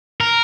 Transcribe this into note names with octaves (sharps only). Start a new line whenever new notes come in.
A#4